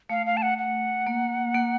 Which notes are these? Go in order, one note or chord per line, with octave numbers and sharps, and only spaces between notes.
A3 F5
F5
A5
F#5
F#5
A#3
A#3